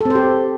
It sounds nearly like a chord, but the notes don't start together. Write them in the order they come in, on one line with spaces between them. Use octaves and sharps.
A4 C4 C5 G4